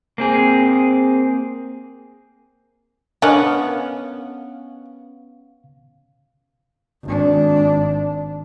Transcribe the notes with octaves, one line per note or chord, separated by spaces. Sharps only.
A#3 C4 G#4
B3 C#4 D4 A#4 D#5 F5 F#5
G#1 D4